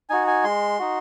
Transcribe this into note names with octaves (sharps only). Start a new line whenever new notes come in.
D#4 F#4 G#5
G#5
G#3 C6
D#4 F#4